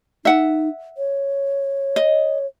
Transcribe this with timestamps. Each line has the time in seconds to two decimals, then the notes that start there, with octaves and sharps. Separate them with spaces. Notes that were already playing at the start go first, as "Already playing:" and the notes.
0.25 D#4 E5 F#5
0.98 C#5
1.96 D#5